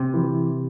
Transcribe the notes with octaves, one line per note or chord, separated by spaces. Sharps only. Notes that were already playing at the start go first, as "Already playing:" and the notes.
Already playing: C3
E3